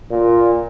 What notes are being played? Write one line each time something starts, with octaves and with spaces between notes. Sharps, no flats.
A#2